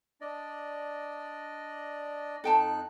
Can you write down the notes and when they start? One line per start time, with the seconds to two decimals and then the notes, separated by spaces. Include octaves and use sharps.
0.21 D4 D5 D#5
2.44 F2 D#4 A4 G5 A5 F#6